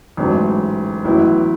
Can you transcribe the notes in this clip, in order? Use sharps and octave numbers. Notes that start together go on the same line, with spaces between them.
A1 G#2 F#3 A3
A1 A2 F#3 B3 E4